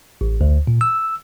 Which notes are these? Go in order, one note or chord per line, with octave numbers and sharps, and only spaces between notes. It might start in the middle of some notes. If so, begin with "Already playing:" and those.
A1
D2
A#2
E6